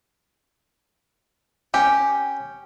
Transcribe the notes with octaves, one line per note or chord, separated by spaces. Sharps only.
C#4 G4